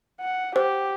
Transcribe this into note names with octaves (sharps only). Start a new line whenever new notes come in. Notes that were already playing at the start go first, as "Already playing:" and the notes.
F#5
G4 C5